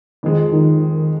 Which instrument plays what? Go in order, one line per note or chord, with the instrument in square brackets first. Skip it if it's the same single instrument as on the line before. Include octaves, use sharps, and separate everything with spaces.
[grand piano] F2 F3 G#3 [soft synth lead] D#3
[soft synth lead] D#3